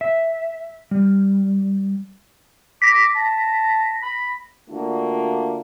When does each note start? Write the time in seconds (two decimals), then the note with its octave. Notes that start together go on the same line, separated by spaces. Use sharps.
0.01 E5
0.91 G3
2.82 D6 A#6 B6
3.15 A5
4.03 B5
4.70 D3 A3 A#3 D4 F4 F#4